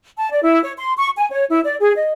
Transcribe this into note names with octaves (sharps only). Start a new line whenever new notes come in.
A5
D5
E4
C#5
C6
C#6
G#5
C#5
E4
D5
G#4
D#5